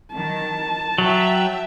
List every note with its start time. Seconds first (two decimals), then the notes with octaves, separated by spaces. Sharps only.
0.13 D#3 F#3 A5
0.98 F#3 E5 G5